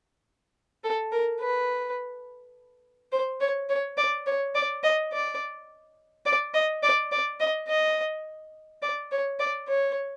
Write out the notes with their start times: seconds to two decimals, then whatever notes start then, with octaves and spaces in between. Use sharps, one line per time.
0.84 A4
1.12 A#4
1.41 B4
3.12 C5
3.40 C#5
3.69 C#5
3.98 D5
4.26 C#5
4.55 D5
4.83 D#5
5.12 D5
6.26 D5
6.54 D#5
6.83 D5
7.12 D5
7.40 D#5
7.68 D#5
8.82 D5
9.11 C#5
9.40 D5
9.68 C#5